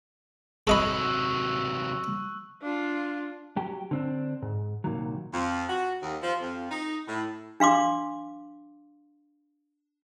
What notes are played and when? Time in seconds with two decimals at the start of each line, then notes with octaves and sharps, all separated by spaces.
0.67 C3 F#3 A4 D#5 B5 C#6 E6 F#6
2.62 D4 F4
3.57 F#3 G4
3.91 D3 C4 D4
4.42 G#2
4.84 C2 A#2 D#3 F#3
5.33 F2
5.69 F#4
6.02 D#2
6.22 F3
6.41 F2
6.71 D#4
7.08 A2
7.60 D4 F5 C6 D6